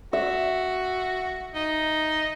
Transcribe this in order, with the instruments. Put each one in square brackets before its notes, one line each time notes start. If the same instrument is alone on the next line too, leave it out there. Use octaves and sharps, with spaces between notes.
[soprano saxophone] F#4 [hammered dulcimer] E5
[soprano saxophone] D#4